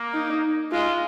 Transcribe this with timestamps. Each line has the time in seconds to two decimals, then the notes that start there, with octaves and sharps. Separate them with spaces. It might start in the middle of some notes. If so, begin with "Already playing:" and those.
Already playing: A#3
0.14 D#4
0.72 G#3 F4